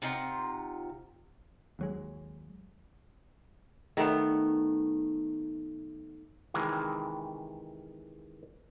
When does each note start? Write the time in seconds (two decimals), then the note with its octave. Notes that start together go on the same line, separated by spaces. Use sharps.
0.02 C3 D#4 F4 F#5
1.79 D#2 F#3 G#3
3.97 D#3 A3 B3
6.54 C3 D#3 E3 G#3